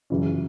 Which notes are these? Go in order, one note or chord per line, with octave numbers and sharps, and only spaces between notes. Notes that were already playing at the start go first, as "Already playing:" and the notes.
F#2 C#3 E3 C#4